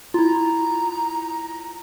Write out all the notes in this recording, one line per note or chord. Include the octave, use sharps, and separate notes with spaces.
E4 F4 A#5